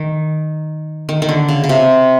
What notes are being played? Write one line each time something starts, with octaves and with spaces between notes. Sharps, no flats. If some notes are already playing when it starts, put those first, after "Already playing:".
Already playing: D#3
D#3
D#3
D3
C#3
C#3
C3